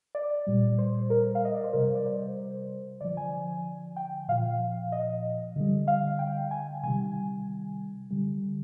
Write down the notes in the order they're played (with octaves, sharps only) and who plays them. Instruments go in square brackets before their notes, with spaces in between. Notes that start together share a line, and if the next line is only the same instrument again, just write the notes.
[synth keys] D5
A#2 G3
C5
A#4
F5
D#5
D5
C5
C3 G3 A#4
D5
C5
D3 F3 D5
G#5
G5
A#2 F3 F5
D#5
D3 G3
F5
G5
G#5
C3 D#3 G3 G#5
D3 G3